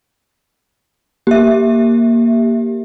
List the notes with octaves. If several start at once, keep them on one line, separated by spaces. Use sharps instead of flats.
A#3 G4 E5